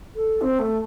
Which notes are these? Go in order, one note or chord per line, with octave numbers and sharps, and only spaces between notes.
A4
C4
A3